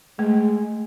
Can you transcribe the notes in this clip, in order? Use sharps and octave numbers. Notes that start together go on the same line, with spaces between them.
G#3 A3